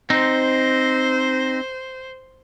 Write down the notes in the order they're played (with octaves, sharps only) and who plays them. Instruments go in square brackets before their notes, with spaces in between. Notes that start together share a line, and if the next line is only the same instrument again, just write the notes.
[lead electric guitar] C4 D#4 [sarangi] C5